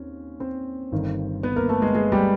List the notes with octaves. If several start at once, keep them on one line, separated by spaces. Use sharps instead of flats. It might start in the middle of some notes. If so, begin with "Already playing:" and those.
Already playing: D#2 C4 C#4
C4 C5
G1 G2 D#3
B3 B4
A#3 A#4
A3 A4
G#3 G#4
G#3 G#4
G3 G4